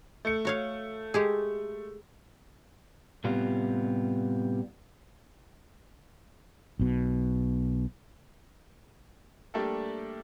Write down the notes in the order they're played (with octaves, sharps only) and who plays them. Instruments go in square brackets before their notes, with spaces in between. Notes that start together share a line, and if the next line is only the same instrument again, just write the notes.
[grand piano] A3 C#7
[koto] F#4 C#5 F5
G#3 G4 G#4
[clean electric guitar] A2 C3 G3 B3 F4
[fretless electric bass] B1 B2
[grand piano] G3 A3 A#3 D4 G4 A4